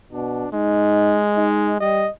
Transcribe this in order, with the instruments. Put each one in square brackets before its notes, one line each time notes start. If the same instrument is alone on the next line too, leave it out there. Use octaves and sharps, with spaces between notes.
[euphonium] B2 [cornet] D4
[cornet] G#3 [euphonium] D#4
[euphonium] D#4
[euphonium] G3 [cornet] D#5